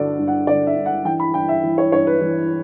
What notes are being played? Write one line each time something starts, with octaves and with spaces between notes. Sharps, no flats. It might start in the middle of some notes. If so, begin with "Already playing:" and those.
Already playing: G2 D3 F#4 A4 D5
G2
F#5
D3 D5
E5
G2
F#5
E3 G5
B5
G2 G5
E5
E3
C#5
G2 C#5
B4
E3